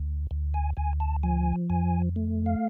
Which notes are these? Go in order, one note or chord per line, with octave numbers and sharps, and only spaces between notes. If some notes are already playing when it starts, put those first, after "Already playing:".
Already playing: D2
D2
G#5
D2 G#5
A5
F3 G#5
F2 G#5
A3
F5